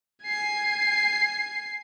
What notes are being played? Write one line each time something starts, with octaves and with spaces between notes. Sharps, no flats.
G#5 C7